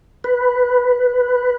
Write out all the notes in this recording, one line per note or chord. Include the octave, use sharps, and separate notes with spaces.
B4